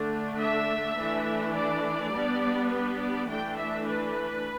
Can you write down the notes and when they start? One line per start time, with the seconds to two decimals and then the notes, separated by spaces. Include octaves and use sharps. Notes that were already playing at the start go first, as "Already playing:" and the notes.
Already playing: D3 A3 D4
0.38 E5
0.97 E3 A3 D4
1.55 D5
2.12 G3 B3 D4
2.70 B4
2.99 D5
3.28 E3 A3 D4 G5
3.57 E5
3.86 B4